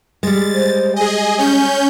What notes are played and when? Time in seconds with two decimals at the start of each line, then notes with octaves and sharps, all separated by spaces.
0.23 G3 G#3 A6
0.54 C5
0.96 G#4 D#5 G#5
1.38 C#4 G#5 G6